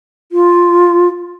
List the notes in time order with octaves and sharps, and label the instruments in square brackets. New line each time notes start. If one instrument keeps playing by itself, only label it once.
[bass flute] F4